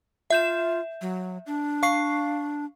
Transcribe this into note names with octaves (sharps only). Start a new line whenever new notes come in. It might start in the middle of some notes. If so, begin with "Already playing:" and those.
F4 E5 G6 E7
F#3
D4
F5 C#6 C7